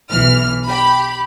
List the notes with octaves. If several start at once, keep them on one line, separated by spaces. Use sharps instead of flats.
B1 E3 F6
G4 B5